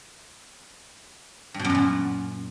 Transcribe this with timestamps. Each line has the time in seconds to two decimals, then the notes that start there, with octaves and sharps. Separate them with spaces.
1.54 G2
1.59 B2
1.65 F#2
1.70 A#2
1.75 F#2